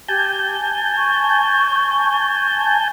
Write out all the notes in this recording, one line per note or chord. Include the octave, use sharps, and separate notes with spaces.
G4 G#5 A5 G6
C#6